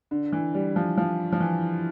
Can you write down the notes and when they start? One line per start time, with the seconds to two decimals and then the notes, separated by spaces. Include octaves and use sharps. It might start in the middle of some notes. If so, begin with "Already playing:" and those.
0.11 D3
0.32 E3
0.54 G3
0.76 F3
0.97 F3
1.32 F3
1.40 E3